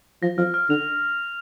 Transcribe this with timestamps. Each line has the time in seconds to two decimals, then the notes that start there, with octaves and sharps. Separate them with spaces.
0.22 F3 A#6
0.38 F3 F6
0.54 F6
0.70 D3 F7